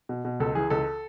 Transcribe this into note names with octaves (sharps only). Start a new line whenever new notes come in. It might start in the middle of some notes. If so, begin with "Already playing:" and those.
B2
B2
C#2 A4
E3 G#4
C#2 A4